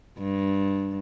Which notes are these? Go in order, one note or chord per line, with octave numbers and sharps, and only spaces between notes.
G2